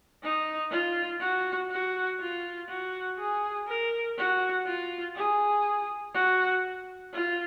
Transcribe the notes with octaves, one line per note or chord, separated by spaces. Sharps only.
D#4
F4
F#4
F#4
F4
F#4
G#4
A#4
F#4
F4
G#4
F#4
F4